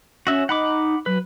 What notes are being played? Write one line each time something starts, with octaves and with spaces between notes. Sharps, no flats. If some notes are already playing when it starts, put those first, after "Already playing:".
C#4 F#4 E5
D#4 F#5 B5 D6
F#3 B4